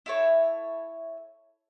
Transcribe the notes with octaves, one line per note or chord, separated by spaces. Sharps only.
E4 A4 C#5